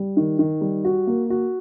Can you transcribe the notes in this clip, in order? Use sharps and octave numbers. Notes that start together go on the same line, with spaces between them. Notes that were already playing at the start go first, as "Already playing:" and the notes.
Already playing: G3
D#3
D#3
G3
F#4
A#3
F#4